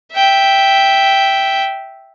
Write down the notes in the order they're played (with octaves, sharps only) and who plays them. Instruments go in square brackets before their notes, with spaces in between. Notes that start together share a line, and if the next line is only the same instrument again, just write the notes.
[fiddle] E5 G5